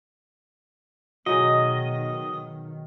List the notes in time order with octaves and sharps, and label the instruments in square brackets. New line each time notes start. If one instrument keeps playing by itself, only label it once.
[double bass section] B2 D#3 [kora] F#3 D#4 G#4 [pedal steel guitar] D#5